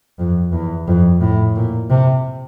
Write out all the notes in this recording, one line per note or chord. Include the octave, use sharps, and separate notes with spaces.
F2
E2
F2
A2
A#2
C3